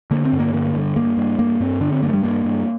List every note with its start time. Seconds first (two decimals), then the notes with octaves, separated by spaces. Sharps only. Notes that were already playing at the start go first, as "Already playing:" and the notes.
0.11 D3 A#3
0.25 C4
0.33 G2
0.40 A#3
0.54 D3 A#3
0.76 G2
0.96 G2 A#3
1.17 G2
1.39 G2 A#3
1.60 G2 C4
1.81 D3 D4
1.92 C4
2.03 G2 A#3
2.09 A3
2.13 G3
2.23 G2 A#3
2.44 G2